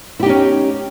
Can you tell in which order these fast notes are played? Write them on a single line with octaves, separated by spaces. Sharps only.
E4 G4 D#4 C#4